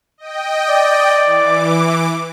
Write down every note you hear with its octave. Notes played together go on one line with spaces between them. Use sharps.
D#5 G5
D5
E3 D6